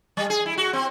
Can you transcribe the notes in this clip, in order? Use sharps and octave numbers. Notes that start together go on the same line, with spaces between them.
G3
G#4
E4
F#4
C4